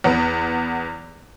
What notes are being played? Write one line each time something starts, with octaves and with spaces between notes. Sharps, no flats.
E2 B3